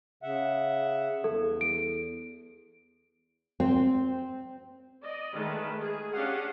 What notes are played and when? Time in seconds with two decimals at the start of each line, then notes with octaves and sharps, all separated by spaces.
0.23 C#3 E5 F#5
1.24 E2 A4
1.61 D7
3.60 C4
5.03 D5 D#5
5.33 D#3 G#3 A3 B4
5.80 G#4
6.13 C#4 D4 G4 G#4 F5 F#5